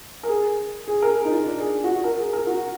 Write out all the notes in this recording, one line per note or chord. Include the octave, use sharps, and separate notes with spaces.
A#4
G#4
G#4
A#4
G#4
D#4
F4
D4
G#4
F#4
F#4
A#4
G#4
A#4
F#4